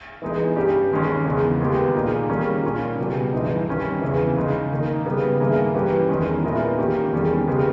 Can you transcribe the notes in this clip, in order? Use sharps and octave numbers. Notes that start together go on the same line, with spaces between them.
E3 G#3 B3 D#4 G#4
G2 G3 C#4 G4
D#2 D#3 G#3 C#4
E2 C#3 G#3
D#2 D#3 G#3 B3 G4
A#2 A#3 D#4 G#4
D#3 G3 A#3 C#4 G#4
A#2 A#3 C#4
C#2 B2 G3
G2 E3 G#3 D#4
D#3 G3 C#4
E2 C#3 E3
C#3 G#3 D#4
D#3 A#3 D#4
C#3 G3 B3
G2 D#3 A#3 E4 G#4
E3 G3 C#4 G4 B4
E2 D#3 G#3 C#4
A#2 G#3 B3 E4 A#4
D#3 A#3 C#4 G4
E2 D#3 G3 C#4 G#4
C#3 G#3 B3 G4